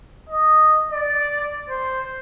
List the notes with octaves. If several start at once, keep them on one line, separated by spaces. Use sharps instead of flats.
D#5
D5
C5